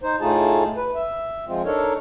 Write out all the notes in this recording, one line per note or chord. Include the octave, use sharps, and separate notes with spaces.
D#4 C5
A2 A3 D#4 F4 G#4 A5
B4
E5
F3 G#3 C4 F4
D4 D#4 A4 A#4 C#5